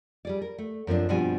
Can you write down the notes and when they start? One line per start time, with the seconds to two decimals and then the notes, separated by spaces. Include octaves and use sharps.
0.25 G3 G#4 D5
0.42 A#4
0.58 A3
0.87 F#2 F3 C4 D4
1.09 G2 B2 F3 G3 C4 G#5